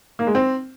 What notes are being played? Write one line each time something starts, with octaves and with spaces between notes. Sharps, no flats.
A#3
G#3
C4